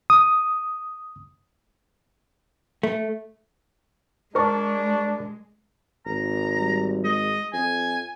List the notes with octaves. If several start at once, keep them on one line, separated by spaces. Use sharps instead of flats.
D#6
A3
G#3 D4 A#4 C5 A5 C#6
G#1 A#5
G3
G#3 D#5
F2 G#5